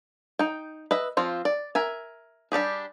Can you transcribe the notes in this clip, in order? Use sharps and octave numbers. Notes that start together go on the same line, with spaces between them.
D#4 G5
B4 D#5 E5
F3 C4 F4
D5
A#4 E5 G#5
G3 D4 G4 G#4